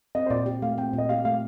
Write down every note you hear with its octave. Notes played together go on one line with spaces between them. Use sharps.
C4 D#5
C5
A#2 D5
G4
A3 F5
C4 G5
A#2 D#5
G4 F5
A3 F5